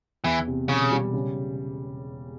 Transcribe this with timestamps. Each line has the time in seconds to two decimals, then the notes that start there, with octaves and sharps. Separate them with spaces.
0.24 E2 E3
0.47 C3
0.69 E1 C#3
0.92 G3
1.13 C#3